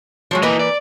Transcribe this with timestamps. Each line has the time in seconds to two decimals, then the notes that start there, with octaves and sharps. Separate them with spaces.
0.31 F3 F#3 G#3
0.43 E3 A#3 E4 B4 D#5
0.59 D5